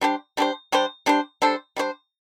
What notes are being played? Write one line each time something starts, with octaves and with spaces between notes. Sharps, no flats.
G3 D4 G4 C5
G3 D4 G4 C5
G3 D4 G4 C5
G3 D4 G4 C5
G3 D4 A4 C5
G3 D4 A4 C5